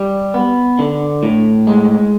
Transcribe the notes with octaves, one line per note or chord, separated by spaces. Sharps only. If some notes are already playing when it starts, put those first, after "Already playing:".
Already playing: G3
B3
D3
A2
G#3